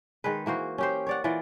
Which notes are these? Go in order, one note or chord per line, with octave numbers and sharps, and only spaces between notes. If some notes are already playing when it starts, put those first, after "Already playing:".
D#3 G#3 G#4 B4
E3 A#3 F#4 C5
C#4 G4 C5
C#5 D5 F#5
E3 F4 D5 F#5